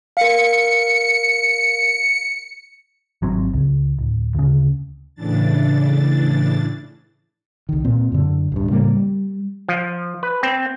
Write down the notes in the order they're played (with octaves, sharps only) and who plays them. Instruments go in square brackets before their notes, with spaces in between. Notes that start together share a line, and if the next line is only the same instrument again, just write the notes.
[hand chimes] A#4 F5 [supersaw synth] C#7
[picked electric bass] G#1 F#3 C4
C#2
D1
D2 C#3
[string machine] A2 C#3 E3 D4 A6
[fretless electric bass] C2 D#3
A#2 C4
F#2 D3
D1 G2
A2 C#3 G3 A#3
G3
[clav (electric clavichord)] F3
B4
C4